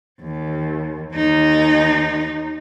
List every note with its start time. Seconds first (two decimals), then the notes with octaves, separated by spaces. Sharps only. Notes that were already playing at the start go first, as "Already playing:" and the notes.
0.21 D#2
1.14 D#2 D#4